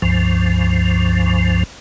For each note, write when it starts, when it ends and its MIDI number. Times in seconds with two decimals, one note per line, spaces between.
0.02 1.64 37
0.02 1.64 43
0.02 1.64 53